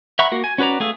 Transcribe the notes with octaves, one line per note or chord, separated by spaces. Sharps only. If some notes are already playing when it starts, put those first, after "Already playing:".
E5 F#5 A#5 B5 C#6
A#3 F#4
G#5
C#4 F#4 B4 D5 A#5
A3 G#4 F5 E6